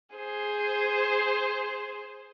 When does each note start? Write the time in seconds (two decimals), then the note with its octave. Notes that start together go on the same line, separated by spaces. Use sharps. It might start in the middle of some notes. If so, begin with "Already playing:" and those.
0.16 G#4 C5